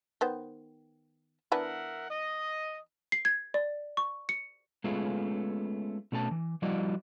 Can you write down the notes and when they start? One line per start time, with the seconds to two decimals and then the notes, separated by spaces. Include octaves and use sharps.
0.21 D#3 B3 C5
1.52 E3 B3 D4 A#4 E5 F#5
2.09 D#5
3.12 C7
3.25 G#6
3.54 D5
3.97 C#6
4.29 C#7
4.84 G#3 A3 B3 C#4 F4 G#4
6.12 B2 A3 C#4 A#4 A5
6.31 E3
6.62 F3 G3 E4 F#4 D5 D#5